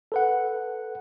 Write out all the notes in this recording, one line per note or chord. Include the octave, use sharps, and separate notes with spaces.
A4 B4 F#5